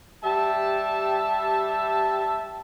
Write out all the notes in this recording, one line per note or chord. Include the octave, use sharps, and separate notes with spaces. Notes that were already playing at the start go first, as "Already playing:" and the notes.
G3 G4 E5 A5